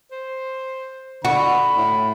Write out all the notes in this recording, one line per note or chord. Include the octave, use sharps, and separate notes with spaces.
C5
D3 F#4 B5
A2